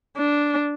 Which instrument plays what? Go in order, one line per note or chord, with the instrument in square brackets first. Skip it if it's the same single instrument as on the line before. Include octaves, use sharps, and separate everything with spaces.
[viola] D4